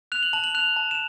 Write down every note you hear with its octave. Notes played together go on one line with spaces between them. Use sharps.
F#6 F7
F#7
A5 F#7
F#7
F#6 F7
A5
E7